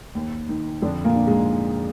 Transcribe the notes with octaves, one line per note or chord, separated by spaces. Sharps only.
D#2
D#3
F2 D3 D4
A#2 A#3
D3
G#2 G#3